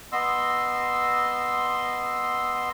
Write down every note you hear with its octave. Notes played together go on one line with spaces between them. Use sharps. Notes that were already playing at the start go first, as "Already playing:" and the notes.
B3 D#5 C6 E6